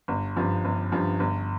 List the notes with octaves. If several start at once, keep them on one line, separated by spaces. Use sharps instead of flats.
G1
G2 F3
G1
G2 F3
G1